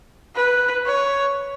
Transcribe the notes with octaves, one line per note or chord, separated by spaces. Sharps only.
B4
C#5